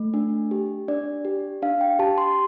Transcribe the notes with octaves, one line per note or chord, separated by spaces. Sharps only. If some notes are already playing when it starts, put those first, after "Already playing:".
Already playing: A3
D4
G4
D4 D5
G4
D4 F5
G5
G4 A5
C6